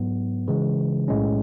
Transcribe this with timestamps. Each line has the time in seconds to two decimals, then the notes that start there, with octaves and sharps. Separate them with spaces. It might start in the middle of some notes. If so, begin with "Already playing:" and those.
Already playing: G#2 F#3 B3
0.48 C#3 E3 G#3
1.08 B1 A2 G#3 C#4